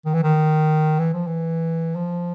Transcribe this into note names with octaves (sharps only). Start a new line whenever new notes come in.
D#3
E3
D#3
E3
F3
E3
F3